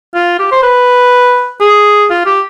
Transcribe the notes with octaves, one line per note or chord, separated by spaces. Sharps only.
F4
G4
C5
B4
G#4
F4
G4